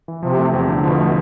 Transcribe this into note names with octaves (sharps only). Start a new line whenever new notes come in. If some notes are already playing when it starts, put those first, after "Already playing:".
E3
C3 F3
A3
E2
D3
B2 F3
A3